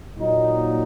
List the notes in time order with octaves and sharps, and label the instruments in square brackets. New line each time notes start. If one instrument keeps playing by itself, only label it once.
[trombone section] A#2 F#3 A#3 D#4